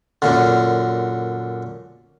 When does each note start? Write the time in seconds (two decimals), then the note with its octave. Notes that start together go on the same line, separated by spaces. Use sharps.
0.22 F#2 A#2 D3